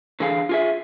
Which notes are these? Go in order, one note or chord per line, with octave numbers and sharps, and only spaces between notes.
D3 E3 G#4 F5
F4 G#4 E5